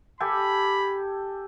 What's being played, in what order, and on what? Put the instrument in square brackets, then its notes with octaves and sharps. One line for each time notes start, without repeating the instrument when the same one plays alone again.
[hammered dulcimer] G4 A4 G#5 [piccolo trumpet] B5